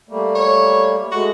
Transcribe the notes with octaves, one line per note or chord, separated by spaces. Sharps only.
G3 A3 A#3
C#5
G#3 A3 F#4